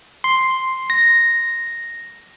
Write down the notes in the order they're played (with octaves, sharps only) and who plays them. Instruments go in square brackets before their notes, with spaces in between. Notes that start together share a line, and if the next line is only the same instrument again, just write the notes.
[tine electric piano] C6
A#6